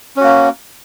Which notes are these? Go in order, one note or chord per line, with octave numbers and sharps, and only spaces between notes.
A#3 C#4 F#4